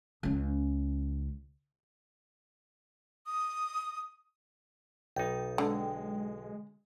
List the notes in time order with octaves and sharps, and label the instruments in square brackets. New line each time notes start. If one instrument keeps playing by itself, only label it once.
[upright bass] C#2 C#4
[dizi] D#6
[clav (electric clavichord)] B1 D#4 [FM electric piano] G5
[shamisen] D3 [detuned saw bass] G#3